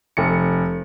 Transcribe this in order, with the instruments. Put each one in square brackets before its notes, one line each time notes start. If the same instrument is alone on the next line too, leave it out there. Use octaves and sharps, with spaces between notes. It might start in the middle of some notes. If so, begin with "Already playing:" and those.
[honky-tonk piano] F1 C#7